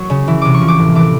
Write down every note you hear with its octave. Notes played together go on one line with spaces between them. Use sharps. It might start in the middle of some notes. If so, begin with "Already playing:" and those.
Already playing: F#3 C#6
C#3
E3
C3 D6
C#6
F3
D6
A2
E3 D6